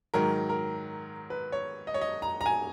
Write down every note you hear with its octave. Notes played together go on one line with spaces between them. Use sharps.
G#2 D#3 F#3 A#4
A#4
B4
C#5
D#5
C#5
D#5
A#5
A#5
G#5